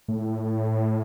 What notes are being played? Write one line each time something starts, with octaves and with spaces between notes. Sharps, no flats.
A2